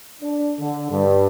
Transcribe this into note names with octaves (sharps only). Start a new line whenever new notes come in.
D4
D3
G2